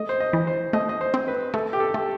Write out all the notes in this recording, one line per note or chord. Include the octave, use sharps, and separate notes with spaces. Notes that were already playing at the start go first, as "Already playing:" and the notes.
Already playing: A3 D#5
C5
D#5
E3
C5
A3 D#5
D#5
C5
C4
B4
A3 A4
G4
A4
A3